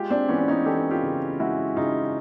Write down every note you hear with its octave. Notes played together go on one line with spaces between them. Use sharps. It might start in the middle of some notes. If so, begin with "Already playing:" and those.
Already playing: G#3 F4 G4
C4 D4
E3 B3 C#4
D4
C#4 D#4
E3 G4 A4
F4 G4
C#3
G#3 E4 F#4
C#3 D#4 F4